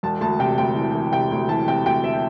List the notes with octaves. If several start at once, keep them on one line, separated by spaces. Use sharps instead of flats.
E1 A5
D2 A5
C3 G5
D2 G5
E3
E3
C3 G5
D2
E3 A5
C3 G5
D2 G5
E5